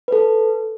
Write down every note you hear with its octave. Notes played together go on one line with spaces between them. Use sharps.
B4
A4